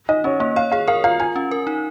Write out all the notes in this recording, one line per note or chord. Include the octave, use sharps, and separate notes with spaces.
D#4 D#5
C#4 C#5
A#3 D#5
C#5 F5
G#4 F5
A#4 F5
F4 F5
F4 G#5
C#4
A#4
D#4